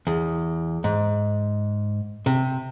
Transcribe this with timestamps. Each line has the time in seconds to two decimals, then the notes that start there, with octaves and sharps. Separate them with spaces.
0.07 E2
0.84 G#2
2.26 C3